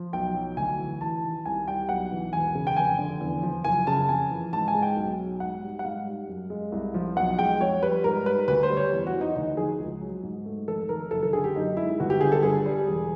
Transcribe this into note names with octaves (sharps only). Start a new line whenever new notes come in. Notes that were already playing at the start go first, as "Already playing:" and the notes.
Already playing: F3
B1 G5
F#3
D2 G#5
E3
A1 A5
D#3
C2 G#5
G3 G5
B1 F#5
E3
E1 G#5
C#3
G5
F1 G#5
D3
E2
F3
F#1 G#5
C#3 A5
F2 G#5
E3
G#2 A5
G#5
G#3
G5
B1
F#3
G#2 F#5
G3
F#5
G#2 F5
G3
F#2
G#3
C2
F3
B1 F#5
G#3 G5
F2 C#5
G3 B4
G#2 A#4
G3 B4
D2 B4
C5
G3
C#5
E2
F#4
E3
D#4
D2 D#4
F3 G#4
C#2
F#3
G#2
A3
F1 A4
D#3 A#4
F#1 A4
A4
D3 G#4
G4
F#2 D#4
G#3 E4
G1 F#4
G4
D3 G#4
A4
G2 G#4
G3
E1